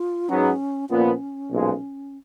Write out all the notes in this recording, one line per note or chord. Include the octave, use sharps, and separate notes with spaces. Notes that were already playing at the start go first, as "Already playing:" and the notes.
Already playing: F4
G#2 F#3 B3 C#4
A#2 F3 B3 C#4
B1 A#2 F3 G#3